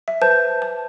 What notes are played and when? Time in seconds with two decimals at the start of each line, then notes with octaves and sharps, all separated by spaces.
0.08 E5
0.22 B4 C5 A5 G6
0.62 A5